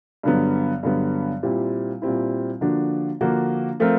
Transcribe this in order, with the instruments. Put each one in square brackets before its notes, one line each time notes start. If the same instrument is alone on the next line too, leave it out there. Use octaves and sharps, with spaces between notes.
[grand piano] G2 D3 F#3 B3
G2 D3 F#3 B3
A#2 G3 C4 E4
A#2 G3 C4 E4
D3 F3 A#3 D4 F#4
D3 F3 A#3 D4 F#4
F3 A3 C4 F4 A#4